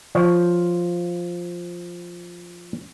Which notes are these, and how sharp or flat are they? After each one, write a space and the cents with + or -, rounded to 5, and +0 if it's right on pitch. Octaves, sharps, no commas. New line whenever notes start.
F3 +0 C#5 +0